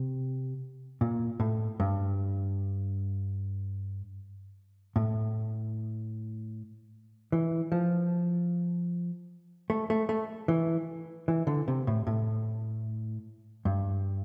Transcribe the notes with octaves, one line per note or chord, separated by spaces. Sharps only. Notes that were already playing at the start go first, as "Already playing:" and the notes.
Already playing: C3
A#2
A2
G2
A2
E3
F3
A3
A3
A3
E3
E3
D3
C3
A2
A2
G2